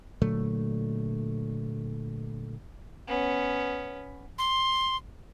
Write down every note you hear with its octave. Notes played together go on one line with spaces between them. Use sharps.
A#2 D3 F#3 A3
B3 C#4
C6